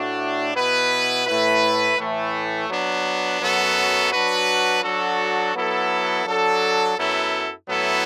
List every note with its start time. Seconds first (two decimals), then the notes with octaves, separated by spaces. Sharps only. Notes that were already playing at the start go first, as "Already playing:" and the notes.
Already playing: A2 A3 D4 F#4
0.55 B2 B3 E4 B4
1.26 A2 A3 E4 B4
1.97 A2 E3 A3
2.69 F#3 B3 D4
3.40 F#2 F#3 B3 F#4 A4
4.12 F#3 D4 F#4 B4
4.83 F#3 D4 F#4 A4
5.55 F#3 B3 E4 A4
6.26 F#3 D4 A4
6.97 F#2 F#3 B3 E4 A4
7.69 A2 F#3 B3 E4 A4